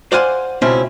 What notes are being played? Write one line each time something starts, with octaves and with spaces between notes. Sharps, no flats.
C5 D5 F5 F#5 G#5 C6
C#2 B2 C4 C#4 E4 C5